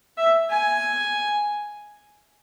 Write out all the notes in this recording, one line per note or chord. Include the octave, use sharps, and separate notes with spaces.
E5
G#5